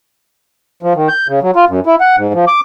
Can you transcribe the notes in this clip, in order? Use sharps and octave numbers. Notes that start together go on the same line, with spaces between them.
F3
D#3
G6
C#3
F#3
F4
F#2
E4
F#5
G#2
F3
D6